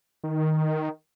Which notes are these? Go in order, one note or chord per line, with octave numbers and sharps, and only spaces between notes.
D#3